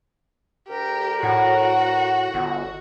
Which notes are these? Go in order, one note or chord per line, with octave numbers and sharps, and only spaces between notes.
D2 G4 A#4
A2 F#4 F#5
G1